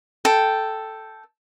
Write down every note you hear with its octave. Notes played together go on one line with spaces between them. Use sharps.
A4 G5